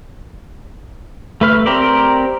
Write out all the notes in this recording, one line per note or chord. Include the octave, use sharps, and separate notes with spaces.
A3 B4 F6
C4 G4 A#4 C5 D5